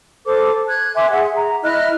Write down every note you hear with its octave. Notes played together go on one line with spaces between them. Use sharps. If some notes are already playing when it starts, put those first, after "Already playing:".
A4 C5 D6
F#6 G#6
E5 G#5 C6 D6
G#4 E5 F#5
A#5
E4 D#5 F6 F#6